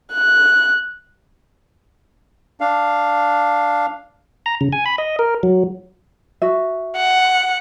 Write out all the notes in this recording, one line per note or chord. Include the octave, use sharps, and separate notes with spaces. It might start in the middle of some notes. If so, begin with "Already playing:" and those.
F#6
D4 F5
A#5
C#3
G#5
B5
D#5
A#4
F#3
F#4 E5
F#5